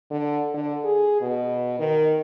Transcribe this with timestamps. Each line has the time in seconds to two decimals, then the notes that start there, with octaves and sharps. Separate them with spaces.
0.11 D3
0.54 D3
0.84 G#4
1.21 B2
1.79 D#3